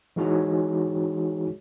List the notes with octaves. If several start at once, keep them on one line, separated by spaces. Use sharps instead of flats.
E3 G#3 D#4 F#4 G#4 C#5